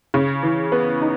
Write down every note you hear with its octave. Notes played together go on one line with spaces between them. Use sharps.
C#3
E3
B3
D#4